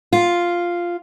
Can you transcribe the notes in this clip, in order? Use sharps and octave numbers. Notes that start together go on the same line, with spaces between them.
F4